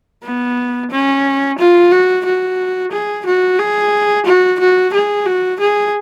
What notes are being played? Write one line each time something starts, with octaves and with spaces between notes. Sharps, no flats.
B3
C#4
F4
F#4
F#4
G#4
F#4
G#4
F#4
F#4
G#4
F#4
G#4